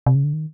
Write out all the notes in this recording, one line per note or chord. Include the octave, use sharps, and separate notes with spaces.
C3
C#3
D3
D#3